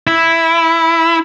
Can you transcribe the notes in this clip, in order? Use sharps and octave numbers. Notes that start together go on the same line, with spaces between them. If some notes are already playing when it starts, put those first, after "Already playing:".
E4